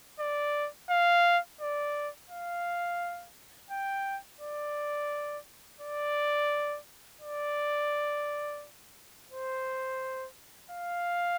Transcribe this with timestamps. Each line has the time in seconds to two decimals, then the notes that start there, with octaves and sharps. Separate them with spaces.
0.20 D5
0.90 F5
1.61 D5
2.30 F5
3.70 G5
4.40 D5
5.81 D5
7.21 D5
9.30 C5
10.70 F5